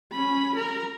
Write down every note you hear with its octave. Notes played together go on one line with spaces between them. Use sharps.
C#4 B5
A#4 A#5